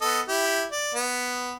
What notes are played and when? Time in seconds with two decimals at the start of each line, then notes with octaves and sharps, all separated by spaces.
0.01 B3 A4 D#5
0.28 E4 G4
0.72 D5
0.95 B3